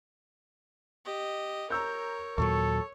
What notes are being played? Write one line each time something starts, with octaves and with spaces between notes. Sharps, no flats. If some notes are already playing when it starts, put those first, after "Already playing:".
G4 D#5
A#4 C#5 A#5 E6 G6
D#2 A#2 F#3 A4 C#5 C#6